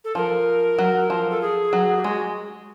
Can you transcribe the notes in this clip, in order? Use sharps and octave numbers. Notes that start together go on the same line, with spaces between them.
A4
F3 A#4
F#3
F3
A4
G#4
F#3
G4
G#3 F#4